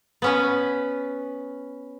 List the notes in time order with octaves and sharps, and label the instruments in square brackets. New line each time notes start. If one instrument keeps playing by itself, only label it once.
[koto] B3 C#4 B4